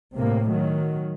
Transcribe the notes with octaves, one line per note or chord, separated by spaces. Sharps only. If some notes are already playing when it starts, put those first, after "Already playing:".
A2 C3 A#3
D#3 F#3